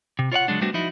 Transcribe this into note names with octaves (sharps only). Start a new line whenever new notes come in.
C3
F4 C#5 D5 F#5
C#3 F#3 G#3 D4
G3 A3 B3 C4 D4 F#4
F3 D#4 E4 F#4